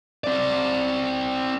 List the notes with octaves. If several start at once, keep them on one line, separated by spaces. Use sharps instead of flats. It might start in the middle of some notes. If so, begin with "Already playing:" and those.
C4 D5